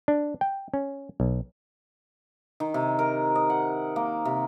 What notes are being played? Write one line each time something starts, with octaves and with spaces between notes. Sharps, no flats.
D4
G5
C#4
B1
D#3
C3
A#4
D#5
F#5
A#3
C3